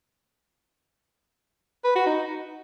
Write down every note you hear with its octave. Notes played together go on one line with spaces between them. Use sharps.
B4
F#4
D#4